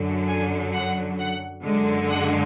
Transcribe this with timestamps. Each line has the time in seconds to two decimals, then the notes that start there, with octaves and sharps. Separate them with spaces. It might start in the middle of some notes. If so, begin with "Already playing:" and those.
Already playing: F#2 D3 F#3
0.28 G#5
0.74 F#5
1.19 F#5
1.64 F#2 D3 G#3
2.10 F#5